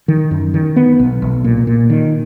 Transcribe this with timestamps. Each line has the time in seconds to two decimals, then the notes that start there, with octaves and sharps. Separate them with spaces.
0.08 D#3
0.31 F#2
0.54 D#3
0.76 B3
0.99 B1
1.22 B1
1.44 A#2
1.67 A#2
1.90 D#3